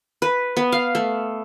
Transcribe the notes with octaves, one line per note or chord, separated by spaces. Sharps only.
B4
B3
F5
A3